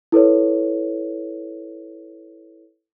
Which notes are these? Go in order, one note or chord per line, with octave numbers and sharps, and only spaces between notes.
E4 A4 B4 C#5